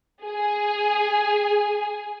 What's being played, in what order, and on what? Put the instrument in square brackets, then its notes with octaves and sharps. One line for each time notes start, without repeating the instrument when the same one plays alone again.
[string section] G#4 G#5